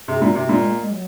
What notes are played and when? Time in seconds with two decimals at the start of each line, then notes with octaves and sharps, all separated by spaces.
0.08 C3 G#4
0.18 F#4
0.22 A#2
0.28 F#4
0.35 C3
0.49 A#2 G#3
0.60 G#3
0.70 A#3
0.81 G#3
0.91 F#3